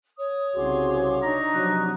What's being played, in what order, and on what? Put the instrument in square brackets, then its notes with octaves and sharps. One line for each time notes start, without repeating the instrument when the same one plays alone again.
[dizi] C#5 [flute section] D#6
[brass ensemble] C2 C#3 F#4 [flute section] G#4 C6 D6
[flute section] D4 D#4 C#6 [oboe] A#5
[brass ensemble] C3 F3 F#3 [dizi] F#6